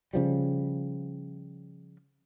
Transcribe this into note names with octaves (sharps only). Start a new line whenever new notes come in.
C#3 F3 G3